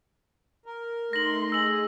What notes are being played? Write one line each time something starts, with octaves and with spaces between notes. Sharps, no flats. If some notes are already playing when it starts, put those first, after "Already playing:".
A#4
A3 D#4 C6 A#6 F#7
G#4 D#5 E6 F#7